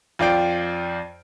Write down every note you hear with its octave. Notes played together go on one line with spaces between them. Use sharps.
F2 F4 D5 G5 D7